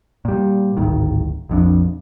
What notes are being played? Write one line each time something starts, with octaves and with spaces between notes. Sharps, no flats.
A#2 G3
D1 G#1 D#3
A#1 F2 D4